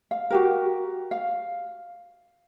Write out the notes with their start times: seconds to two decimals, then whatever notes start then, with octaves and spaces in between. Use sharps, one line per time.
0.11 F5
0.30 F#4 G4 A#4
1.11 F5